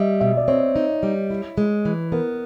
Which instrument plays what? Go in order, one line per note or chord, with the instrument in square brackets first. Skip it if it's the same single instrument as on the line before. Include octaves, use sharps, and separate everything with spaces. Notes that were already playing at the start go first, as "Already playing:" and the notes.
Already playing: [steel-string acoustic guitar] G3 [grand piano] D#5 E5
[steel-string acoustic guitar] B2 [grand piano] E5
[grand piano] D5
[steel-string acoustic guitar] C4 [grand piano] C#5
[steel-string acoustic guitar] D#4
G3
E4
G#3
E3
[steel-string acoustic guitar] B3 [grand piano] A#4